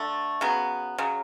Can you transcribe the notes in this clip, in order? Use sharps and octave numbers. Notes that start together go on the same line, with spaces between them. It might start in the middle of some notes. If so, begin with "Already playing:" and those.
Already playing: D3 A3
C#3 F#3 B3
C#3 F#3